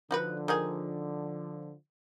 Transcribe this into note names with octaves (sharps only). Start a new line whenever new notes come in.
D3 F3 D#4 F#4 B4
D#3 D#4 G#4